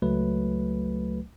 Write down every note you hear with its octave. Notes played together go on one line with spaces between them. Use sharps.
C#2 F#3 A3 B4